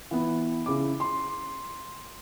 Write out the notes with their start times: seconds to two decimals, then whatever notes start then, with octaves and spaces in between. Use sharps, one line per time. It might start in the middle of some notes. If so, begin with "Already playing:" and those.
0.11 E3 B3
0.66 C#3 E4 D6
1.00 C6